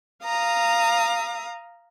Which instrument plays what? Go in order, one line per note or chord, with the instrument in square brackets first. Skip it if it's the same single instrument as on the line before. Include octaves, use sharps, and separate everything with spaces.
[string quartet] F5 A#5 D#6